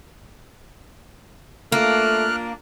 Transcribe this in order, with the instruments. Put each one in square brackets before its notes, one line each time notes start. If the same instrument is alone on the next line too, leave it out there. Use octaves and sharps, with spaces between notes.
[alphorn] A3 [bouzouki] A#3 [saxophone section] D4 F4 [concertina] F6 F#6